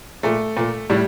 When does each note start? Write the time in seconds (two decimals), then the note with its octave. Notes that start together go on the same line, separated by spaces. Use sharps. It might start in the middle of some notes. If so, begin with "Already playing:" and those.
0.23 A#2 A3
0.57 A#2
0.90 A2 G3